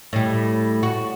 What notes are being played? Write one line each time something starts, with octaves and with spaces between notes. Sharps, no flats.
A2 G3
F#4